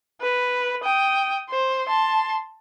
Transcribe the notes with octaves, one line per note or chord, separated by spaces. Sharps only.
B4
G5 D#6
C5
A5 C6